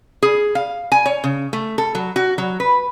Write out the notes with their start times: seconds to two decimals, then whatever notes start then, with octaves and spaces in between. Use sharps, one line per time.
0.22 G#4
0.55 F5
0.92 G#5
1.06 C#5
1.24 C#3
1.53 A3
1.78 A4
1.95 F#3
2.16 F#4
2.38 F#3
2.60 B4